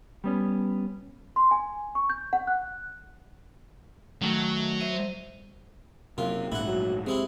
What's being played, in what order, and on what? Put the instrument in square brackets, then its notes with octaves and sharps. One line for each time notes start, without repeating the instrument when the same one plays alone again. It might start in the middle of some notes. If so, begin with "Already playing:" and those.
[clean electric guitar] G3 B3 C#4
[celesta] C6
G#5
C#6
G6
F#5
F#6
[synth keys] D#3 A3 [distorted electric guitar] F#3
[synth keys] C5 E5 D#7
[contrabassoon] F#1 [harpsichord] F#2 F4 [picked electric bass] C3
[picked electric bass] A#1 G#2 [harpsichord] E4 F#5
[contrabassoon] F#3
[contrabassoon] C3 [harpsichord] G#3 C4 E4